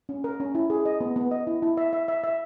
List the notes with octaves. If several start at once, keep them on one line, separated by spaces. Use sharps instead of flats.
C#4
A#4
C#4
E4
G#4
D#5
B3
B3
D#5
E4
E4
E5
E5
E5
E5